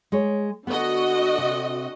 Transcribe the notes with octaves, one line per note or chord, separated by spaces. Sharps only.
G#3 C#5
D3 B3 F#4 D#5
C3